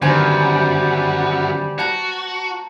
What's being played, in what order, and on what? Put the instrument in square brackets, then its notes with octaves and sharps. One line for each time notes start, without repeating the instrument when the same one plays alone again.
[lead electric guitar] F#2 [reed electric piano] D3 D#3 [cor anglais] G3 [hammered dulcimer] B3 C5 G#5
[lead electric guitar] F#4 [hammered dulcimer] A5 A#5